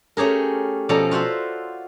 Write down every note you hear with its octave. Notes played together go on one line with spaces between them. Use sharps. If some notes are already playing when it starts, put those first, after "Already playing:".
A3 C#4 G4 G#4 A#4
B2 F3 C#4 A4 D5 A#5
F4 F#4 C5 E5